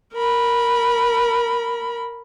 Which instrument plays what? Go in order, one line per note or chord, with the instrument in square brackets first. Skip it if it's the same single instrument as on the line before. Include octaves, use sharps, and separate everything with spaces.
[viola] A#4 B5